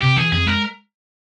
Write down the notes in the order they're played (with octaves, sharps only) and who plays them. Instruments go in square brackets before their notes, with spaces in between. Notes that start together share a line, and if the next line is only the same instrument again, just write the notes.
[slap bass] C3 [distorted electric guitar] G4
[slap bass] E3 [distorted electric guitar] G#4
[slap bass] F2 [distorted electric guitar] G#4
[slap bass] G#3 [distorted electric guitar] A#4